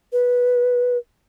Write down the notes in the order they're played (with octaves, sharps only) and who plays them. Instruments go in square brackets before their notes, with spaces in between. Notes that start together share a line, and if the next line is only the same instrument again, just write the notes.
[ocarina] B4